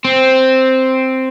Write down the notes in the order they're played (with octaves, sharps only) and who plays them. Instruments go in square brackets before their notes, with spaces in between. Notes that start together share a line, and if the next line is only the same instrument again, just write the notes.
[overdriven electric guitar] C4